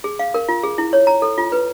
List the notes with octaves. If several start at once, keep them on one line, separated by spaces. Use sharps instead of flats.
G#4
F5
A#4
F4
G#4
E4
C#5
A#5
A4
F4
B4